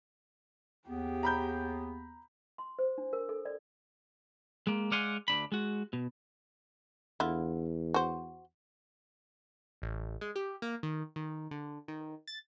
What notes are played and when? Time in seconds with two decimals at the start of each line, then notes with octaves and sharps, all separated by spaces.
0.88 D#2 B3 G4 G#4
1.23 A#5 B5 G6
2.58 C6
2.79 C5
2.98 D4
3.13 A#4
3.29 A4
3.45 D5
4.67 G#3 A#3
4.91 G#3 D5 F5 F#5 G#5 C6
5.28 D2 D4 B5
5.52 G#3 F#4
5.93 B2
7.20 E2 D3 E4 F4
7.94 F#4 C5
9.82 A1
10.21 G#3
10.36 G4
10.62 A#3
10.83 D#3
11.16 D#3
11.51 D3
11.88 D#3
12.28 A6